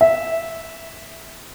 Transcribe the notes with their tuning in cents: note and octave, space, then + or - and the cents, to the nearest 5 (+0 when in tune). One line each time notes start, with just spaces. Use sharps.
E5 -10